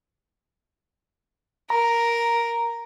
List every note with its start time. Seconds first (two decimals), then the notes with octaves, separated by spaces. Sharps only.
1.70 A#4 A#5